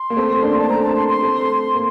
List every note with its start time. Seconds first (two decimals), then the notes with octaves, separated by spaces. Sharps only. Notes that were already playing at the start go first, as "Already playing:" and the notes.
Already playing: C6
0.10 A#3
0.17 A3 C4
0.43 A#3 D4
0.58 A5
0.69 A3 C4 A#5
0.82 A5
0.96 C6
1.09 C6
1.23 A3 C4
1.75 A#3